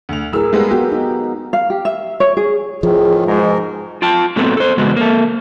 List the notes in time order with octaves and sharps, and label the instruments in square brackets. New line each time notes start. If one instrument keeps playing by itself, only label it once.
[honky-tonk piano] D2 F7
[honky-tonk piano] A2 E6 [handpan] F#3 G#4 A#4
[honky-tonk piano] G3 G#3 B3 [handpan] F5
[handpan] B3 F#4 [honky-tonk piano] G4
[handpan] D#4
[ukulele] F5
G4
E5
C#5
G#4
[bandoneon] E2 A2 D#3 [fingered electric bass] F3 [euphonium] G#4
[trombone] G#2 [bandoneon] B2 A#4 [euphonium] G#3
[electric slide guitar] F4 G5 A5
A2 F#3 B3 C4 A4
A4 C5
E2 C#3 G#3 B3 F#4
A#3 A4